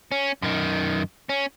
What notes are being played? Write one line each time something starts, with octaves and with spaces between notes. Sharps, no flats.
C#4
F#2 D#3
C#4